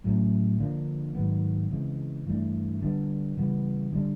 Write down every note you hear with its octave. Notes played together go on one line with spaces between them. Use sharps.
A2 F#3 A3 C#4
D3 F3 A#3 D4
G#2 D#3 F#3 B3
C#3 E3 G#3 C4
G2 E3 A3 D4
D3 G3 B3 D4
C#3 E3 G3 B3
D3 G3 B3 D4